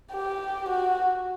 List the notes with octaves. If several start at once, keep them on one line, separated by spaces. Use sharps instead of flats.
G4
F#4